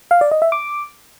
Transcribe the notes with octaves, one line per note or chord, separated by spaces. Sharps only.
F5
D5
D#5
E5
D6